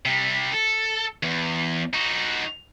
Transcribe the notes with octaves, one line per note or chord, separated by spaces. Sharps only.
C3 G3
A4
E2
D#4 F#4